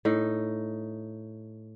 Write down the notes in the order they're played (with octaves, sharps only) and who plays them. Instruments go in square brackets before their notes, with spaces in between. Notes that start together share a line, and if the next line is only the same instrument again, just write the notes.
[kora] A2 D#4